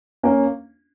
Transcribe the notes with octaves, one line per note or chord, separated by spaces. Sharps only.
A#3 C#4